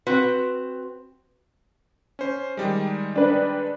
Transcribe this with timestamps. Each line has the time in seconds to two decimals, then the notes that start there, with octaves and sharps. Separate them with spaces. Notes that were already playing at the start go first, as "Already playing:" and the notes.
0.07 C4 F#4 B4
2.19 C#4 C5
2.57 D#3 G3 G#3
3.15 D4 B4